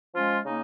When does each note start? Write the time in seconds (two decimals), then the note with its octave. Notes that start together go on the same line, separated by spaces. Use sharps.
0.14 F3 G#3 C#4 F4
0.44 C#3 A#3 D#4